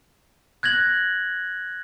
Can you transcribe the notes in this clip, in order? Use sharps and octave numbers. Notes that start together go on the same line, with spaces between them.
F#6 G#6 A#6 F#7